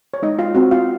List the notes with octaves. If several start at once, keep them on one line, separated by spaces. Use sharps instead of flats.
C#5
G#3 D#4 D#5
F4 F5
C4 F#4 F#5
F4 F5